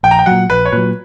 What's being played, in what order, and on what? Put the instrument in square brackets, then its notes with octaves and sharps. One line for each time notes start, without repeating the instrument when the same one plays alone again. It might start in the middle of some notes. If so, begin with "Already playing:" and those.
[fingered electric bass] A#1 [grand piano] G5
[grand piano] A#5
G5
[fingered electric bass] A#2 F#3 [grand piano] F#5
[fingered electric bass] A#1 [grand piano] B4
[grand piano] C#5
[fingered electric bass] A#2 F#3 [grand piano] B4